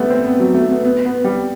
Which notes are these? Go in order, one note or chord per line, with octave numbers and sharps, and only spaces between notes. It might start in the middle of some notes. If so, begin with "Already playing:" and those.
Already playing: G3 A3 B3
C4
B3
F#3
A3
B3
B3
B3
G3